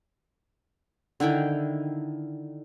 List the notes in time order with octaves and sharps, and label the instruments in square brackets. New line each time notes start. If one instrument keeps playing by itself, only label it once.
[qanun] D3 D#3 E4 G5